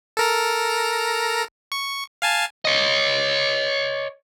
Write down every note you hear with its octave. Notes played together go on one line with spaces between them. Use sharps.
A4 A#4 A#5
C#6
F5 G#5 A5
C#5 D#5